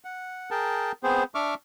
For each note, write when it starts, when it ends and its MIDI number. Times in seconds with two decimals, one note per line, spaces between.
0.05 0.50 78
0.51 0.92 68
0.51 0.92 70
0.51 0.92 79
0.51 0.92 81
1.03 1.23 59
1.03 1.23 60
1.03 1.23 68
1.03 1.23 72
1.35 1.54 62
1.35 1.54 76
1.35 1.54 85
1.35 1.54 86
1.35 1.54 89